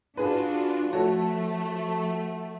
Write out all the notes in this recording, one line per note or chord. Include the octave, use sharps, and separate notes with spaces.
D4 F4 F#4 G#4 B4
F3 A3 F#4 A4 C#5